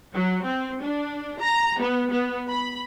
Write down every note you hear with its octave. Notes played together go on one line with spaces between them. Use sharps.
F#3
C4
D4
A#5
B3
B3
B5